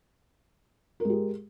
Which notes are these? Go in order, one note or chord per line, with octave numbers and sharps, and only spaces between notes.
G#3 G4 A#4